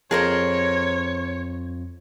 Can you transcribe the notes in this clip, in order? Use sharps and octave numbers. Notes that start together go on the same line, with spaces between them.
F2 F4 G#4 A#4 C5 C#5 C7